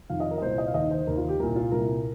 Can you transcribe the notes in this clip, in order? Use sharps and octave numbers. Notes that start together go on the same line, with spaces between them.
F2 D#3 F5
D#5
A#4
D#5
C2 A#2 C5
D#5
F5
D#2 D#3 D#5
C5
D#2 D#3 A#4
F4
G4
C2 A#2 A#4
F4
C2 A#2 A#4